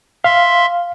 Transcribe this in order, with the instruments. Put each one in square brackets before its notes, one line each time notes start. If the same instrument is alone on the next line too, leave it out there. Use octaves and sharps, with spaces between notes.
[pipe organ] E5 C6 [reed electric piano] F5